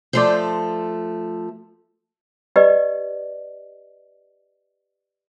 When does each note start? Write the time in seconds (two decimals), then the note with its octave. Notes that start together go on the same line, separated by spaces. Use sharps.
0.13 F3 A3 A4 D5 C6 G6
2.56 G4 B4 D5 D#5